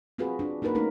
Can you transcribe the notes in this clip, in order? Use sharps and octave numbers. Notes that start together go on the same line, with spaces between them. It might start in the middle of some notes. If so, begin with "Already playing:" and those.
C4 F4 F#4 G#4 B4
D4
A#3 D#4 F#4 A#4 B4
A3 C#4 D#4 A#4